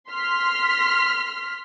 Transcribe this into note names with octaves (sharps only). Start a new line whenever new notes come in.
C6 F6 B6